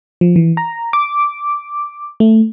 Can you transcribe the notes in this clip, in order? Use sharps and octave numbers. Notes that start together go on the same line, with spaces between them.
F3
E3
A#5
D6
A3